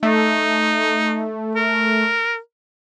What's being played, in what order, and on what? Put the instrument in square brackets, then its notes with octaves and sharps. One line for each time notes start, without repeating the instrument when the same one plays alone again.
[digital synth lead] A3 [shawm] D#4
[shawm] A#4